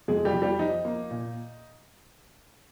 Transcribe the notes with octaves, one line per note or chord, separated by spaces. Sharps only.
F2 G#3 G#4
G3 G4
F2
G3 G4
F3 D#4
A#3
A#2